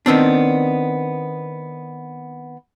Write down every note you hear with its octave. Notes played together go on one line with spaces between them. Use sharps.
D#3 B3 C4 D4